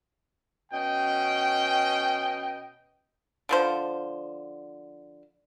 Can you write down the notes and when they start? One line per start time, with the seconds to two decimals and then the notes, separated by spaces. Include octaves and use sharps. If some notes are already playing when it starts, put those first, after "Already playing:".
0.72 B2 C#4 D#5 G5
3.49 D3 F3 C5